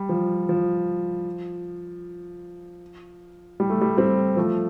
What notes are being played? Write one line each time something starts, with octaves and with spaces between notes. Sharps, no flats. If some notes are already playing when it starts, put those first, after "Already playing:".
Already playing: G3
F3
F3
G3
A3
G3
G3 C4
F3 A3